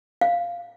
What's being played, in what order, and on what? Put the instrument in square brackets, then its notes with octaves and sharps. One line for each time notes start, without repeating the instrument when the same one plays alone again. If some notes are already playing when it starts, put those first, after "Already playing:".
[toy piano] F5